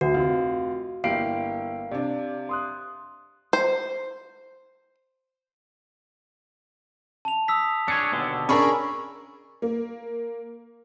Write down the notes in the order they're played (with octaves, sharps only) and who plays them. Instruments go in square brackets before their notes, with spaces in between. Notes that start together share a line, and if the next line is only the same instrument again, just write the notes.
[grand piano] D2 [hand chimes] F#4
[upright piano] F1 [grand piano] F4 F5
[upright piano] G1 E4 G4 [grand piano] A#3 C7 D7 [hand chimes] F5
[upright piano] C3 D4 [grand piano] D5
[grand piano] C6 D#6 F#6
[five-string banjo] C5
[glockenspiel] A5 F7
D#6 E6 B6
[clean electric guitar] D4 G#4 C#5 [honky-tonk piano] C#7
[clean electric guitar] D#2 B2 D3
[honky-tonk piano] C#4 D4 A#4 [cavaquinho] G#4 B5 C#6
[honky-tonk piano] A#3